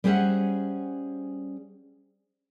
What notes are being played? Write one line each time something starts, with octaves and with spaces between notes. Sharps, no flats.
G3 C#4 G#4 C5 E5 F#5